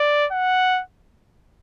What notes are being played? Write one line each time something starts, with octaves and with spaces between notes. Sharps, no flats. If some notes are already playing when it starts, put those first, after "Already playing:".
Already playing: D5
F#5